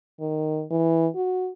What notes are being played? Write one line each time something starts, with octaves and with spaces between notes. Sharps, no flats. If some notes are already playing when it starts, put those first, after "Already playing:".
D#3
E3
F#4